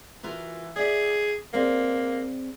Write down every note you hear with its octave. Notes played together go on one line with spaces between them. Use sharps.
E3 F4 F#4 A#4
G#4 D5 E5
A#3 C4 G#4 D5